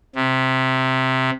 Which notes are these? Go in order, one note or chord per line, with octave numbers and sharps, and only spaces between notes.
C3